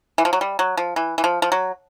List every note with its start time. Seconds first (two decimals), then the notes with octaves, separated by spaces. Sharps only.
0.18 E3
0.25 F3
0.33 F#3
0.41 G3
0.59 F#3
0.77 F3
0.96 E3
1.18 E3
1.24 F3
1.42 F3
1.52 F#3